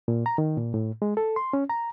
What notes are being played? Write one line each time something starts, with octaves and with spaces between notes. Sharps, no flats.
A#2
A#5
D#3
A#2
A2
G#3
A4
C6
C#4
A#5